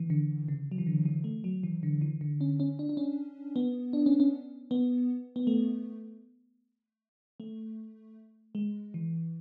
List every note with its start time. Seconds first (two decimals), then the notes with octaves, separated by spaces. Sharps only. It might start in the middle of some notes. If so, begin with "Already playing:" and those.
Already playing: E3
0.10 D3
0.48 C#3
0.71 F#3
0.78 E3
0.86 D3
1.05 E3
1.24 A3
1.44 F#3
1.63 E3
1.83 D3
2.01 E3
2.21 D3
2.41 C#4
2.60 C#4
2.79 D4
2.89 D4
2.97 C#4
3.56 B3
3.93 D4
4.06 C#4
4.20 C#4
4.71 B3
5.36 B3
5.47 A3
7.40 A3
8.55 G#3
8.94 E3